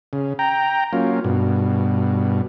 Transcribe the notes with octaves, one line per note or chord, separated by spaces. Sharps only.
C#3
G5 A#5
F#3 A#3 C#4 F4
G2 B2